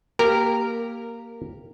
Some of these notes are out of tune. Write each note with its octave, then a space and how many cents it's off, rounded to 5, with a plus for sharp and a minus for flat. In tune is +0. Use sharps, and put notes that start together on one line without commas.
A#3 +0 G4 +0 A#4 -15